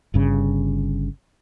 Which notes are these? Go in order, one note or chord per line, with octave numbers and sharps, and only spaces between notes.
G1 G2 C#3